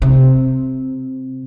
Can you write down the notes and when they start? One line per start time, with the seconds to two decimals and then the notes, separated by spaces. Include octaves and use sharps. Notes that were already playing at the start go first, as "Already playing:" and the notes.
0.02 C3